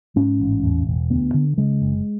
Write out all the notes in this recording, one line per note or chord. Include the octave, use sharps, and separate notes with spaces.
G#2 C#4
A1
E2
E1
D2 B3
D3
C#3 G#3
F#1